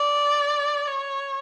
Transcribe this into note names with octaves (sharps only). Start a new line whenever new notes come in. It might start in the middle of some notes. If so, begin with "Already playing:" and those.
Already playing: D5
C#5